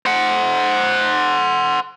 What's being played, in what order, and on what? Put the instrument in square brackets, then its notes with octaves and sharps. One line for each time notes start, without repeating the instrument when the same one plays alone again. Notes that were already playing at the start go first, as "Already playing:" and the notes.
[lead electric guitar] C5 F#5